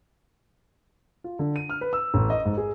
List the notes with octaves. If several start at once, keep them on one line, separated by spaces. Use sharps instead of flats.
F4
D3
D#7
F6
B4
E6
A1
D#5
G#2
G#4